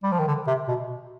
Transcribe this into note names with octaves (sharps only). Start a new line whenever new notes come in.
G3
F3
D#3
D3
C3
B2